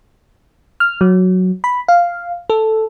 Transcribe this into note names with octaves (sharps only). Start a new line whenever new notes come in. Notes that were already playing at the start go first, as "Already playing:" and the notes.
F6
F#3
B5
F5
A4